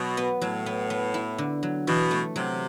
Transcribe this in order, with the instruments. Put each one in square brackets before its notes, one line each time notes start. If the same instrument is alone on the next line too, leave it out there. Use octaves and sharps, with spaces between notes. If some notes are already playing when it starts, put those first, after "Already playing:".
Already playing: [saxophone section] B2 [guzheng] F#3
[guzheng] B3
[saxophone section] A2 [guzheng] F#3
[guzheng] B3
B3
E4
D3
F#3
[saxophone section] B2 [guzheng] E3
[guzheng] A3
[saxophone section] C3 [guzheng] F#3